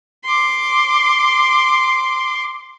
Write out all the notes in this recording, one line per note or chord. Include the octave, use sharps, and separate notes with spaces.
C6 D6